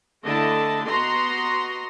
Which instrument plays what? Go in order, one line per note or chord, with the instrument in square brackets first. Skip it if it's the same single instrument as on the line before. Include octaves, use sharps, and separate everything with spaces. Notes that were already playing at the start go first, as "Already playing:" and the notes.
[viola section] D3 A3 E4 D#5 A5
B3 F#4 D#5 A#5 C6